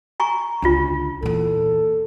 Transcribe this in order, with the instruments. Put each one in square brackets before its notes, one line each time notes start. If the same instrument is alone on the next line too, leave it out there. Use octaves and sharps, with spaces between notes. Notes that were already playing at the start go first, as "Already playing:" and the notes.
[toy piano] G#5 A#5 C#6
[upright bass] C#2 D3 [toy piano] D4 F4
[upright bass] E2 A#2 [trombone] A4